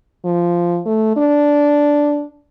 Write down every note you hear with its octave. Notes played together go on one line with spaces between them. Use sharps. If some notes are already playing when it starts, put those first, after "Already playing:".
F3
A3
D4